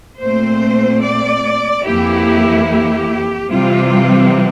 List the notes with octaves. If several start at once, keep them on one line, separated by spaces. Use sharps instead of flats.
A#2 A3 C4 C5
D5
F2 E3 A#3 E4 G4
G4
C3 E3 G3 C4 F4